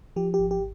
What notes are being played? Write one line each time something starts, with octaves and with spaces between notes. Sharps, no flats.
F3 G4
G4
G#1
G4